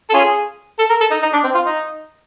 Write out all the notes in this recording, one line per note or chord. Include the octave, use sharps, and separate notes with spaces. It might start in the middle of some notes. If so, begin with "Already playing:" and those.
A4
C#4 F4 G#4
A4
A#4
A4
D#4
D#4
D4
C4
F4
D#4